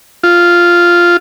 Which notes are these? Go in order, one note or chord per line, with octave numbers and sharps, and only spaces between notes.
F4